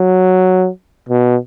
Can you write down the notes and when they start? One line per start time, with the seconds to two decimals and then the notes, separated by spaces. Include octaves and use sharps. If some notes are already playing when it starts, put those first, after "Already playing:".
Already playing: F#3
1.09 B2